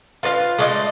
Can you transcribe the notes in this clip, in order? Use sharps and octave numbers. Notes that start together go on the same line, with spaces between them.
F4 B4 D5 F5
G#3 A3 D5 D#5